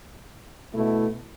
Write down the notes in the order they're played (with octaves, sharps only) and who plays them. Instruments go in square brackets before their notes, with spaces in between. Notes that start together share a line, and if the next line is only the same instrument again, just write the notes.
[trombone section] B2 A3 E4